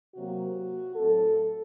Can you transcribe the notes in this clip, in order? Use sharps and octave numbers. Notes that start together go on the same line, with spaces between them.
C3 F#3 A#3 F#4
A2 F#3 A3 C4 A4